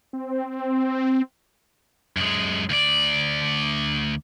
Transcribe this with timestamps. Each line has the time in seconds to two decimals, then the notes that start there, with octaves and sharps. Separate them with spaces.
0.13 C4
2.17 F#2 G#3
2.70 D2 D5